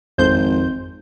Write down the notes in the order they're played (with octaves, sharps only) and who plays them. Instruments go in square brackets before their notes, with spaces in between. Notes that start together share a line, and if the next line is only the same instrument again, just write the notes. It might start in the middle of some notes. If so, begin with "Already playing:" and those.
[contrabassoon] G#1 [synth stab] F2 C5 G6